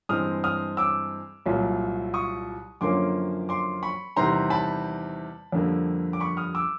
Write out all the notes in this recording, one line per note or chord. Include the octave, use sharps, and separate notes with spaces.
G2 E3 G#3 C4 D#6 F6
D#6 F6
D6 E6
C2 A#2 F#3
C#6 D#6
F#2 D3 F3 A#3 C#4 C6 D6
C6 D6
B5 C#6
E2 C3 D#3 G3 A#5 C6
A5 B5
F2 D3 G3 A#3
D6
B5 C#6
D#6 F6
D6 E6